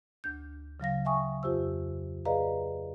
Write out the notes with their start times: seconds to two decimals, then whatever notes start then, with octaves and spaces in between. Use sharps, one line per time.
0.24 D2 D4 G6
0.80 C#3 F#3 F5 A#6
1.05 E5 G5 G#5 C#6 D#6
1.43 F2 F4 G4 C5 E6
2.25 G#4 B4 D5 D#5 F5 A#5